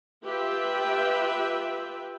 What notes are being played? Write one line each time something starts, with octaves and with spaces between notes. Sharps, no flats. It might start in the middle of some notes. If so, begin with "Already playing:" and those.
F4 G4 B4 E5 G5